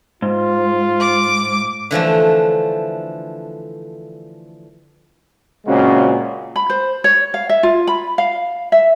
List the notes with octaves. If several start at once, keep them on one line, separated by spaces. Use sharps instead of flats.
G#2 F4
D6
D3 E3 F3 A3
A#2 C#3 G#3 C4 C#4 F#4
B5
C5
C#5
F5
E5
F4
B5
F5
E5